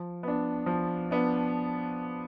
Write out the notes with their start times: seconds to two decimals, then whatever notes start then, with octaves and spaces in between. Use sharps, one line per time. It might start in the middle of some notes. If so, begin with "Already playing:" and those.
Already playing: F3
0.23 B3 D4
0.66 F3
1.11 B3 D4